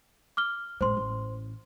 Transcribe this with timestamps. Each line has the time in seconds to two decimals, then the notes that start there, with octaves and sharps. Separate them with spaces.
0.37 D6 F6 G7
0.81 A1 G#3 C5 C6
0.97 A1